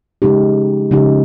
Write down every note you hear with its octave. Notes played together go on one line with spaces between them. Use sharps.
C#3 F3 G#3 D#4 G4
C#3 F3 G#3 D#4 G4